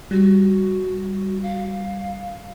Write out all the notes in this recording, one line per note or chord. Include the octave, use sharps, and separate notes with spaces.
G3 F#4
F5